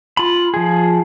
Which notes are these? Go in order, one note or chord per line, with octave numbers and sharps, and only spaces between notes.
F4 B5
F3 G#4